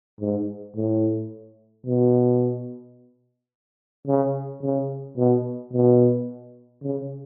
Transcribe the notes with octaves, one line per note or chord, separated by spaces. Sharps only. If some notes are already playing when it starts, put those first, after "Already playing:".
G#2
A2
B2
C#3
C#3
B2
B2
C#3